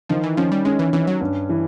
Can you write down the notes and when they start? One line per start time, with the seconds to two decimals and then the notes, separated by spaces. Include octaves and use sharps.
0.09 D#3 F3
0.23 E3
0.37 F3 C#4
0.52 G3
0.65 G#3 C#4
0.79 E3
0.93 E3 C#4
1.07 F#3
1.21 G2
1.49 E3